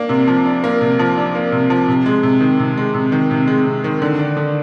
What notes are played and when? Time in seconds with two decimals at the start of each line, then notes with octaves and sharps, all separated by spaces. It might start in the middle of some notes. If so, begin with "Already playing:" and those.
Already playing: A#3 D4
0.09 C3
0.27 F3
0.45 D4
0.64 A#3
0.81 C3
0.99 F3
1.17 D4
1.35 A#3
1.52 C3
1.70 F3
1.88 C3
2.06 G#3
2.23 C3
2.41 D#3
2.59 C3
2.77 G#3
2.94 C3
3.12 D#3
3.31 C3
3.47 G#3
3.66 C3
3.84 D#3
4.02 D3
4.19 D4
4.37 D3